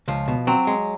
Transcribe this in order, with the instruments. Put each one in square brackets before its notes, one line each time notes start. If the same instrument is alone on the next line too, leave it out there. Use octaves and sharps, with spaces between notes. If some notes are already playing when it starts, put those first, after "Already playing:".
[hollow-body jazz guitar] C#2 [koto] F3
[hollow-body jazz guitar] B2
[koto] F#3 [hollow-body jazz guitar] C4
[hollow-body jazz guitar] G#3